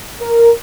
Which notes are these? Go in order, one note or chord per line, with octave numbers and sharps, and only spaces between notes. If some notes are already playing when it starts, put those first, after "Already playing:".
A#4